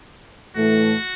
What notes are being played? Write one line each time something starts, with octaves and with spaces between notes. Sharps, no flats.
A2 E3 A3 F#4